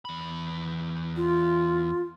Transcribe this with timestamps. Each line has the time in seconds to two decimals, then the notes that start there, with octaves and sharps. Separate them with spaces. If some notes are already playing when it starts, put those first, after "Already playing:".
0.05 E2 B5
1.16 F4